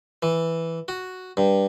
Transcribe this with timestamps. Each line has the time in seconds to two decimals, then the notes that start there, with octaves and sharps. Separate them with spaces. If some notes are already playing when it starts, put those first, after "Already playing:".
0.23 E3
0.88 F#4
1.37 G2